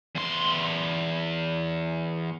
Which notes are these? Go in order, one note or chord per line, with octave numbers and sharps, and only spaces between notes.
E2 C6